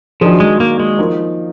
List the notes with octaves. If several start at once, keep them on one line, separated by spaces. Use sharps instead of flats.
D#3 F3 F#3 D4 G#4
G#3
A#3
G#3
F3 A#3 D#4